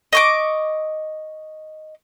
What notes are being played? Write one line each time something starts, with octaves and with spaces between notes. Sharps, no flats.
D#5 C#6 D6